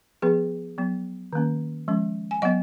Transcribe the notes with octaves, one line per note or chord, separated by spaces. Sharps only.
F3 B3 G#4 B4
F#3 B3
D#3 A#3 C#4
F3 G#3 C#4
G#5
F#3 B3 D#5 F#5